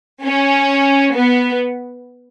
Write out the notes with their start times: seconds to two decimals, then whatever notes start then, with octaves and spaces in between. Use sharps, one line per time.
0.25 C#4
1.15 B3